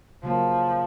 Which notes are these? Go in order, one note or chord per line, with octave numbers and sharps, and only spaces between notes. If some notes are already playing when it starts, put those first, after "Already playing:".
C#3 F3 F#3 A#3